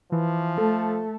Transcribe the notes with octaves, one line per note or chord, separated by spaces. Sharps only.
E3 F3
A3 A4